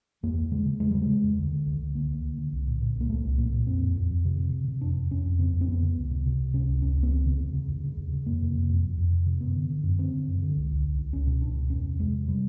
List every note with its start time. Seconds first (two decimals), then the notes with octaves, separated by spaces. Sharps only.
0.23 E2 A#3
0.37 E2
0.51 C#3 G#3
0.65 C#3
0.80 E2 G#3
0.91 C#3 G3
1.02 G#3
1.09 C#3
1.24 E2
1.38 D2
1.53 D3
1.66 D2
1.81 D2
1.95 D2 A#3
2.10 D2
2.24 D2
2.38 D3
2.52 C2
2.67 A#2
2.81 A#2
2.96 C2 A#3
3.10 C2 A3
3.25 C2
3.38 A#2 A#3
3.52 A#2
3.67 F2 C4
3.82 F2
3.97 F2
4.11 F2
4.25 C3
4.39 C3
4.53 C3
4.68 C3
4.81 F2 D4
4.97 F2
5.11 F2 C#4
5.26 F2
5.39 C#3 C4
5.53 F2
5.61 C4
5.68 F2 B3
5.82 C#3
5.97 C#2
6.11 C3
6.26 C3
6.39 C#2
6.53 C3 C#4
6.68 C#2
6.82 C#2 C#4
6.97 C#2
7.03 B3
7.11 D#2 C4
7.26 C#3
7.40 D#2
7.54 C#3
7.68 D#2
7.84 C#3
7.97 D#2
8.12 C#3
8.26 F2 A#3
8.41 C3
8.55 F2
8.69 F2
8.84 F2
8.98 F2
9.12 C3
9.26 C3
9.41 F#2 B3
9.56 D3
9.70 D3
9.83 F#2
9.99 D3 C4
10.13 D3
10.27 F#2
10.42 D3
10.56 C#2
10.71 C#2
10.85 C#2
10.99 C#2
11.13 C#2 C#4
11.27 B2
11.42 C#2 D4
11.56 B2
11.70 E2 C#4
11.85 C3
11.99 E2 G#3
12.13 C3
12.28 C3 G3